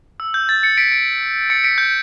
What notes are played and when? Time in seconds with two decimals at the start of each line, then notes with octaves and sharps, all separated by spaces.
0.20 E6
0.34 G6
0.49 A6
0.63 A6 C#7
0.77 B6 D7
0.91 B6 D7
1.50 A6 C#7
1.64 B6 D7
1.78 G6